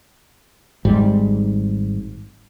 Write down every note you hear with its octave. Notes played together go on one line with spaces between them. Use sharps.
G#1 G#2 G3